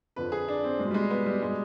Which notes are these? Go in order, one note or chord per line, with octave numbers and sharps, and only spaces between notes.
F2 D3 F3 B4
G#4
D4
C4
B2 G3 G#3
G3
G#3
B3
G3
B2 G3 G#3